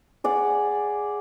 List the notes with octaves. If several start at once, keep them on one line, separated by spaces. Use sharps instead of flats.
G#4 D5 F#5